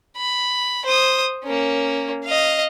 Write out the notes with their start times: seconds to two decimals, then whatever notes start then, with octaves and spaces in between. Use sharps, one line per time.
0.17 B5
0.85 C5 D#6
1.44 A#3 C#4
2.24 D#5 F5